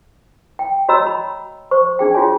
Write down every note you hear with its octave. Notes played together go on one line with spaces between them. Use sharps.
G5
F#4 C#5 D#5 A#5 B5 E6
B5
C5 C#6
D4 G#4 G5
F4 F#4 C#5 G#5